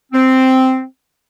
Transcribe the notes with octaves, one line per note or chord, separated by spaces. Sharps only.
C4